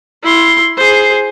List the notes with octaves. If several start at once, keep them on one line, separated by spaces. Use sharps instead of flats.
E4 C6
G#4 C5